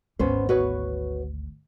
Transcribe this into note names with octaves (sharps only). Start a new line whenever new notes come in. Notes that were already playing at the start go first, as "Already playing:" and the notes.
G#1 D2 B3 C#4 C5
F#4 B4 C#5